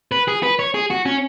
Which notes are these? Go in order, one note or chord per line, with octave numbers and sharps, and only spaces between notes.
B4
G#4
B4
C#5
G#4
F#4
C#4